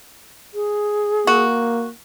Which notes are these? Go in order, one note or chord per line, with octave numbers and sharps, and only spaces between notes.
G#4
A#3 F#4